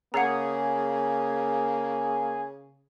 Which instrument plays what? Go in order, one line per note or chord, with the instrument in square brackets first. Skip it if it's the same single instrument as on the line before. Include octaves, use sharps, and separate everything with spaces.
[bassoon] C#3 [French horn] A#3 [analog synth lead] G#4 [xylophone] F#5 A#5